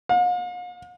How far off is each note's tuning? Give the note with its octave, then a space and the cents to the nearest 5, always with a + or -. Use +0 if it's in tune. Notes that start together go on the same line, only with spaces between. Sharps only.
F5 +45